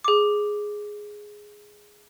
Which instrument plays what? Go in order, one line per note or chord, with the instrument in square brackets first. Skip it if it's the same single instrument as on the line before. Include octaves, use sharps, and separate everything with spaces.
[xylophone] G#4 D6